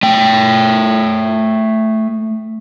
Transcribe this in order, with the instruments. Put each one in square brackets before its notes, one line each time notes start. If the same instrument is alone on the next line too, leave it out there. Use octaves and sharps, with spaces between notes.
[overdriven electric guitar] A3 G5